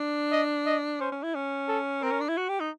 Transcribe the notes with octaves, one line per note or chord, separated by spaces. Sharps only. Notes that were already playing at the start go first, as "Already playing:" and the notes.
Already playing: D4
D#5
D#5
C#4 C5
C#4
E4
C#4
A4
C4 A#4
C#4
D4
E4
F#4
G4
D#4